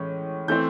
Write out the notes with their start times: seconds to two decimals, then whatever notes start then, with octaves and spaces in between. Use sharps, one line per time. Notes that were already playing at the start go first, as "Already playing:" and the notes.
Already playing: A2 E3 G#3 C#4
0.48 E3 A3 C4 G6